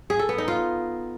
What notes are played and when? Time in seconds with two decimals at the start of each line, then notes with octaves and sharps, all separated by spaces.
0.10 G#4
0.19 A4
0.29 B3
0.38 D#4
0.48 F4